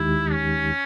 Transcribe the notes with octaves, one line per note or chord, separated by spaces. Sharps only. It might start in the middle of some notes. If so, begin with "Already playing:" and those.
Already playing: D#2 D#3 G#3 D#4 E4 G4
C#4